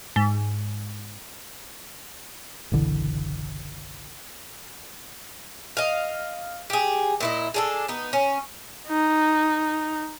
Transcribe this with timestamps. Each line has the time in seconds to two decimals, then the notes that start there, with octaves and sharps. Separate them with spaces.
0.16 G#2
2.72 F#1 B1 D3 E3
5.77 D#5 F5
6.70 G4 G#4
7.21 A#2 E4 D#5
7.54 G#3 D4 A4
7.88 B3 D#4
8.13 C#4
8.88 D#4